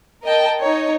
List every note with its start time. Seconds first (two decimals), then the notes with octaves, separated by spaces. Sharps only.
0.23 A#4 D#5 G5 A5
0.61 D#4 C#5